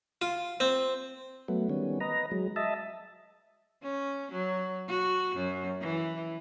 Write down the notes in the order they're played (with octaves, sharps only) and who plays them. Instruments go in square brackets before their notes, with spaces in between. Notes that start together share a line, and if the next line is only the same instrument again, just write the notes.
[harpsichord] F4
C4
[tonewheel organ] F#3 A3 B3
D#3 G3 B3 C#4
B4 D#5 A#5
F#3 G#3
D#5 E5 A5
[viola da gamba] C#4
F#3
F#4
F#2
E3